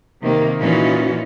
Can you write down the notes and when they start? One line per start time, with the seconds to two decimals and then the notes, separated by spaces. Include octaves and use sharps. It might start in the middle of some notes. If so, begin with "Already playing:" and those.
0.22 C3 D#3 A#3
0.59 A#2 E3 C#4 D#4 F4 F#4